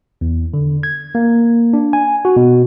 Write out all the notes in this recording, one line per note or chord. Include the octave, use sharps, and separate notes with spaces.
E2
D3
G#6
A#3
D4
G#5
F#4
B2